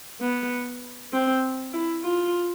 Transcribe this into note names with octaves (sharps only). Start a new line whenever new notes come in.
B3
C4
E4
F4